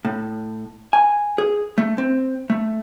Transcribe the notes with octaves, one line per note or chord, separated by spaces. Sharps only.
A2
G#5
G#4
A3
C4
A3